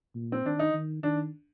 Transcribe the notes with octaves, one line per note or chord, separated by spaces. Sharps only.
A#2
C4
D#3 D4
D#4
D#3
D#3 D4